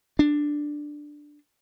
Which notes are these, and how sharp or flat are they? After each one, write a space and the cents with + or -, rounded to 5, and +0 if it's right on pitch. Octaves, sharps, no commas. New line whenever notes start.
D4 +5